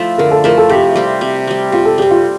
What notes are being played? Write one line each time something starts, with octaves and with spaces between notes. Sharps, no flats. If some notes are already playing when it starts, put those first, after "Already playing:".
Already playing: F3 A3 E4
D3 A#4
A4
F3 A3 E4 A#4
A4
C3 G4
G3 C4
C3
G3 C4
C3 F4
A4
G3 C4 G4
F4